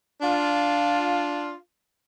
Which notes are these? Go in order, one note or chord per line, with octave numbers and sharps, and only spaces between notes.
D4 F4